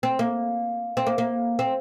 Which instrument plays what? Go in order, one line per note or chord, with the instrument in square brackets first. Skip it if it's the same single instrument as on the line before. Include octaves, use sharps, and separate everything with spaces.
[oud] C4
A#3
C4
A#3
A#3
C4